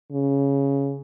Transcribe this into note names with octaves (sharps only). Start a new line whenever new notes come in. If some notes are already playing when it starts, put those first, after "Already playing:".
C#3